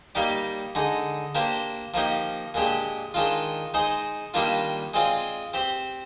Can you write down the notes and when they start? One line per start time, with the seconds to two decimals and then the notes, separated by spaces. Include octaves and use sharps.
0.15 G3 A#3 D#4 G4 D5
0.75 D3 G#3 D#4
1.35 A#3 D4 G4 C5
1.94 F3 A#3 D#4 G4
2.54 A#2 G#3 D4 G4
3.14 D#3 G#3 D4 F4
3.74 G#3 D#4 G#4 C5
4.34 D#3 G3 A#3 D4 F4
4.94 G#3 C4 F4 G#4 D5
5.54 C4 G4 C5